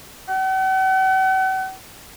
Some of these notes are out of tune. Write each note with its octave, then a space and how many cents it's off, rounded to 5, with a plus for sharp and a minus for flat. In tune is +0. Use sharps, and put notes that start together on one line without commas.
F#5 +45